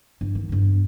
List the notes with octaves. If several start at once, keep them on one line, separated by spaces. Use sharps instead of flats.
G2
D#3
G2 B3